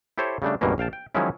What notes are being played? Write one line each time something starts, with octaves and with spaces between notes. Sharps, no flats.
E4 G4 A4 C5 C#5
C#3 G3 A3 D4
C#2 G2 B2 E3 A#3 C#4
A#1 F5 G5 A5
G5
D#3 F3 F#3 G#3 C#4 E4